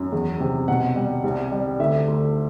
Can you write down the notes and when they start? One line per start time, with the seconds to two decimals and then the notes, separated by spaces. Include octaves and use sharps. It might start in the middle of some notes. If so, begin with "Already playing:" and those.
Already playing: F#2
0.12 E2
0.40 C3
0.68 B2 F#5
0.96 G3
1.23 C2
1.51 G3
1.79 D2 E5
2.08 D2